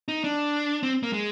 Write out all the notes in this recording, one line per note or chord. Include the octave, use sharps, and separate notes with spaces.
D#4
D4
C4
A#3
G#3